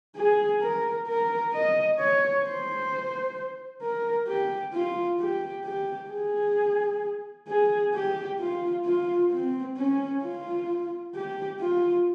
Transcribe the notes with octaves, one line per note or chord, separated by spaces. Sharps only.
G#4
A#4
A#4
D#5
C#5
C5
A#4
G4
F4
G4
G4
G#4
G#4
G4
F4
F4
C4
C#4
F4
G4
F4